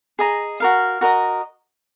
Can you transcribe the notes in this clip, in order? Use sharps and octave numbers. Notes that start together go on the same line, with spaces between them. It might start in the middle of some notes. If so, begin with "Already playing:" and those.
G#4 D#5 A#5
F#4 A#4 F5
F#4 A#4 D#5 A#5